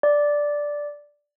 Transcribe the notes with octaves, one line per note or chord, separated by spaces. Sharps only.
D5